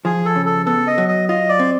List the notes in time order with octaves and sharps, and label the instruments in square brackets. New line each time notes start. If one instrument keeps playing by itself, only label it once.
[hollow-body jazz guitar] F3 [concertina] G#4
[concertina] A4
[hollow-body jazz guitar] C#3
[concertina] A4
[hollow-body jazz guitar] B3 [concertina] A4
[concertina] D#5
[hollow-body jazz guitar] F#3
[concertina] D#5
[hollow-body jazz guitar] F4 [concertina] D#5
[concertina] D5
[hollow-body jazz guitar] C4